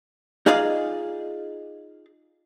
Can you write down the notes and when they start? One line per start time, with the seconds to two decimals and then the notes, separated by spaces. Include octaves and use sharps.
0.46 D#4 F4 G#4 D5 D#5 F5